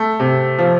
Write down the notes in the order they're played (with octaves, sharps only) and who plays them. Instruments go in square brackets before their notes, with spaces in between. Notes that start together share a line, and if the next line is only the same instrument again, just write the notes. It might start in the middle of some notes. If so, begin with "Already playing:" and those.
Already playing: [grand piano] A3
C3
F3